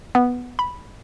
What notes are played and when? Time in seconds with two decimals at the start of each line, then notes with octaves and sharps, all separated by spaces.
0.15 B3
0.59 B5